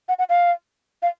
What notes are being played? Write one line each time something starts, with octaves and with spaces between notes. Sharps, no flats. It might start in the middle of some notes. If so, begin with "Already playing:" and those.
F#5
F#5
F5
F5